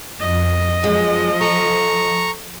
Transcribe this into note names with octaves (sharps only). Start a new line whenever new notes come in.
F2 D#5
F#2 F3 G#3
A4 A#5 C#6